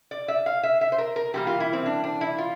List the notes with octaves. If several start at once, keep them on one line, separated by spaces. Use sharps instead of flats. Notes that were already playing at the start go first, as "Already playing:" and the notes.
D5
E5
F5
E5
E5
C5
A#4
A#4
E3 G3 A#3 G4
F4
E4
C4
D4
D4
E4
F4